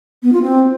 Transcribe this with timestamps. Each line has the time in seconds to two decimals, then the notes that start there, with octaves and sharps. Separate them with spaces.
0.23 B3
0.33 F4
0.42 C4